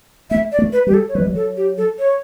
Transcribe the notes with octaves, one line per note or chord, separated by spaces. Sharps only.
A3 E5
D5
A3
B4
G3 G4
A4
C#5
F#3 B4
G3
F#3
A4
G4
A4
C#5